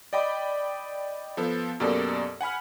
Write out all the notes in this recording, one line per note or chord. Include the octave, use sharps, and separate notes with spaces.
D5 D#5 G5 B5 D6
F3 B3 A4
F#2 B2 A#3 G4 A4 D5
F#5 G#5 B5 F6